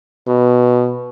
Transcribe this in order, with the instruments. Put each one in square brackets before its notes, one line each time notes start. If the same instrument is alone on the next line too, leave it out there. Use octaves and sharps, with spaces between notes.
[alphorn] B2